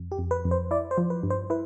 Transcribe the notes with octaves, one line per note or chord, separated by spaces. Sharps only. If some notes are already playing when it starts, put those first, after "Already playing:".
Already playing: F2
G4
F2
B4
F2
C5
E4 D5
C5
F3
B4
G2
C5
E4 B4